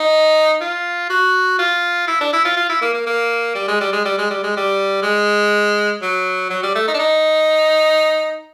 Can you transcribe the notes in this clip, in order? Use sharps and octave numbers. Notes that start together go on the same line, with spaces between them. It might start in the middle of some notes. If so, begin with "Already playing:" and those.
Already playing: D#4
F4
F#4
F4
E4
D4
E4
F4
F4
E4
A#3
A#3
A#3
G3
G#3
G3
G#3
G3
G#3
G3
G#3
G3
G#3
F#3
F#3
G3
A3
D#4
D4
D#4